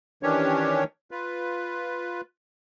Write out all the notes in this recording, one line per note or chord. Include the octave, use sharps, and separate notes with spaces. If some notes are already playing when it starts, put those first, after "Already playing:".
D#3 E3 C#4 D4 G4 C#5
F4 B4